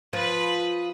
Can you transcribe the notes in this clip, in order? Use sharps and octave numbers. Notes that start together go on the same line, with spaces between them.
F3 F4 B4 B5 D#6